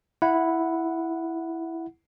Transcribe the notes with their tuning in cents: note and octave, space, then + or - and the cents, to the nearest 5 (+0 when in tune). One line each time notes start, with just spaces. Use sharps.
E4 +0 F#5 -10